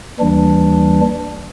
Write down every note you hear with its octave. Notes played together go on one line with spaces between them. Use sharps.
D#2 E3 G3 D4